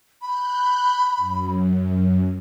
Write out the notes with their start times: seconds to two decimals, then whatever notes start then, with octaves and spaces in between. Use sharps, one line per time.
0.22 B5 F#6 G6
1.17 F#2